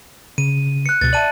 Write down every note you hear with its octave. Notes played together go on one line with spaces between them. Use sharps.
C#3 D#7
F#6 C#7
C#2 B2 A6
D5 E5 A5 D#7 F#7